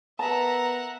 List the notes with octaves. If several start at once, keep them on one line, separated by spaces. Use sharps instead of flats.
B3 A#4 B4 E5 F#5 A5 A#5